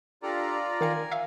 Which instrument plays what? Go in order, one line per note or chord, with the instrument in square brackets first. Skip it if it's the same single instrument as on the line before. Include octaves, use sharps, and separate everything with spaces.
[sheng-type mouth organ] D4 G4 A4 [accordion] F4 D5 A#5
[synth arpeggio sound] D#3 F5 C#7 [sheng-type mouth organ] A#4 G#5
[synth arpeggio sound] E5 F5